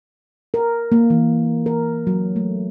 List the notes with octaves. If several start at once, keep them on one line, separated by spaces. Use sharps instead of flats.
A#4
A#3
E3
A#4
F#3
A3